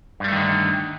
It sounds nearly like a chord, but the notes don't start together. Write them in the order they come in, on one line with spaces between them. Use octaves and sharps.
G2 G3 A3 D#3 D3